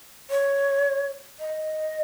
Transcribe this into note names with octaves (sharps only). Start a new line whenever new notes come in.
C#5
D#5